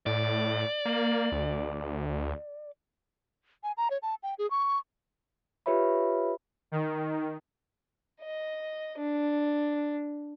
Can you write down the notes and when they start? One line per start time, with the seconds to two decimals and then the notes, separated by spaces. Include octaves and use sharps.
0.06 A2 D5
0.85 A#3
1.32 D2
3.63 G#5
3.77 A#5
3.90 C#5
4.02 A5
4.23 G5
4.38 G#4
4.51 C#6
5.66 F4 G4 B4 C#5 E5 B5
6.72 D#3
8.21 D#5
8.98 D4